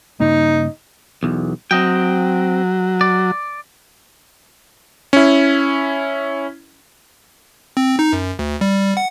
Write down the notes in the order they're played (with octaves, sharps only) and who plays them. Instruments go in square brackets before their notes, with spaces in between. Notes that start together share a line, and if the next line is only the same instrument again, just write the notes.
[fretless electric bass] G2 C#3 A#3 [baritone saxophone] D#4
[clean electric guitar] B1 E2
[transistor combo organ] F#3 [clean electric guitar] C4 D#5 G5
[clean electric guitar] D5
[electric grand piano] C#4 E4
[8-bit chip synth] C4
D#4
F#2
D2
G3
F#5